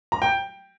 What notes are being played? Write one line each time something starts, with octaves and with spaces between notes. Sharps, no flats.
A#5
G5